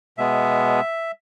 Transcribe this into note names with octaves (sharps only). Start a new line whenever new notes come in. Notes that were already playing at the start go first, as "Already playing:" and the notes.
B2 G#3 B3 E5